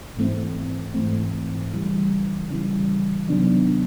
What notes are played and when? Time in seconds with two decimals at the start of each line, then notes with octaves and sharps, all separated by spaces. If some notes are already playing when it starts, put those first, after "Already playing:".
0.17 G#2 E3 A3 C4
0.94 G#2 E3 A3 C4
1.73 C#3 E3 G3
2.50 C#3 E3 G3
3.28 C3 D#3 F#3 B3 D4